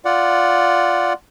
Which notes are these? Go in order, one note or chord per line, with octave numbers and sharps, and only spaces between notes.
F4 D5 F#5